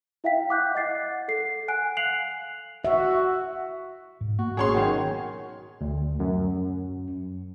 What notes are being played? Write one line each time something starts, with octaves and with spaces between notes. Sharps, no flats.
E4 E5 F5 G5 B6
F#5 D6 F#6 G6
D#5 F#5 A6 C7
A4 C7
F#5 G#5 F#6 D7
F5 F#6 C7 F7 F#7
F#4 E5
G#2
A#3 F#4
G#1 B2 C#4 G#4 C#5 C6
D#3 F#3
D2
F#2